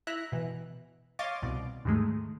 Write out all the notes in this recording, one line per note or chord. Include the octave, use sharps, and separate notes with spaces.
E4 E5 A#5 F#6
B2 E3
C#5 D#5 F5 C6 D6 A6
C2 B2 D5
D#2 G#2 D#3 G#3 A3